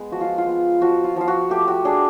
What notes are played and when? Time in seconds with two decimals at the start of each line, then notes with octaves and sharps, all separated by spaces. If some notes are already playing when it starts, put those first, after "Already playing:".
Already playing: G#3 B3
0.11 F3 F#4
0.21 F4
0.38 F4
0.47 B3
0.81 F3 F#4
1.04 F4
1.16 F3 F4
1.28 F#4
1.50 A3 G4
1.68 F#4
1.85 D4 G#4